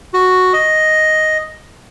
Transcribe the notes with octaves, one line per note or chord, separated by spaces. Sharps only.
F#4
D#5